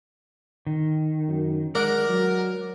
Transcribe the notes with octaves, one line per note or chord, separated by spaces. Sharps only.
D#3
F#2
G#3 A#4 D5 F#5
F#3